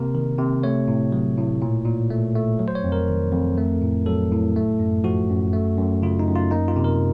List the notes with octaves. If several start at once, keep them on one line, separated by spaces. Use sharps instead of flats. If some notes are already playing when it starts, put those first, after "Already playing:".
Already playing: C3 A#3 A#4
D#3
C3
A3 C#5
A2
F#3
A2
A#2
A#2
A3
A3
F#3
C5
C#5
F2
A#4
D#3
F2
A3
A2
F#3 A4
A2
A3
F#2
F3 F#4
F#2
A3
F#2
C#3 F4
D#4
F#2
F4
A#3 D#4
F4
C3
A#4